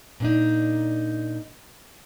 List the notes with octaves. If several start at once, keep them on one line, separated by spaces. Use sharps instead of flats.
A#2 D4 D#4